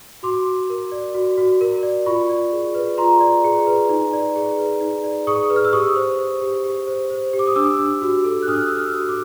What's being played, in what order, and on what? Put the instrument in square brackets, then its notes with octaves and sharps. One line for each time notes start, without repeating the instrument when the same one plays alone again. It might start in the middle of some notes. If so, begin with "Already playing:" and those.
[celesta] F#4 C6 D6
F#4
A#4
D5
F#4
F#4
A#4
D5
F4 B5 C#6
D5
G#4
B4
F4 A#5 C6
D5
G#4
B4
D#4
D5
G#4
B4
D#4
D5
G#4 C#6 D#6
B4
F6
E6
G4 C#6 D#6
C5
C5
G4
G4
C5
C5
G4
D6
D#6
D4 D6 E6
D4
F#4
A4
F#6
D4 D#6 F6
D4 E6
D#6 F6
F#4
D6